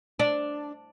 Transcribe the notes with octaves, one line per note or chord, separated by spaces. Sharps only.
D4